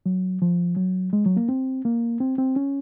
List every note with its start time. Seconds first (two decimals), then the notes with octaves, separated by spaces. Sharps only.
0.06 F#3
0.42 F3
0.77 F#3
1.13 G#3
1.25 F#3
1.37 A#3
1.49 C4
1.85 A#3
2.20 C4
2.38 C4
2.56 C#4